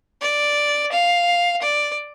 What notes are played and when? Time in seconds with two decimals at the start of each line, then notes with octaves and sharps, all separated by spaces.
0.21 D5
0.92 F5
1.62 D5